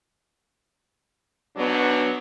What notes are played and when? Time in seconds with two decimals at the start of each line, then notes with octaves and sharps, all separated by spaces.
1.56 G#2 B2 F#3 B3 D4